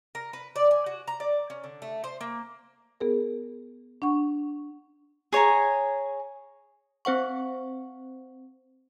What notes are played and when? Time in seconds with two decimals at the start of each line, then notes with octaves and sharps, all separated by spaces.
0.15 A#4
0.33 B4
0.56 D5
0.71 G#5
0.86 F#4
1.08 A#5
1.20 D5
1.50 C#4
1.64 D3
1.82 A3
2.04 C5
2.21 A#3
3.00 B3 G#4 A#4
4.02 D4 F#5 C#6
5.32 G#4 C#5 G#5 A#5
7.05 C4 C5 F#5 C#6